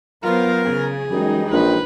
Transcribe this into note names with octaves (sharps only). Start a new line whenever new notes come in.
F#3 B3 F4 A#4 C5
C#3 G#4
F#2 E3 G3 G#3 D#4 D#5 G5
A#1 B4